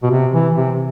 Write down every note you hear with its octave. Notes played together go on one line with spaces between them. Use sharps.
B2
C3
E3
C3